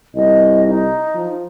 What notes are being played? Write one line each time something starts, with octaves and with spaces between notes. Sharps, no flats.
C2 D#5
D#4
F3